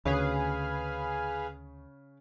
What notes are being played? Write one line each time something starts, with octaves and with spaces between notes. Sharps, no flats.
D2 C#3 G#4 B4 C#5 F5